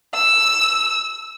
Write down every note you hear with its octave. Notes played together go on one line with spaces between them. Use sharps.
E6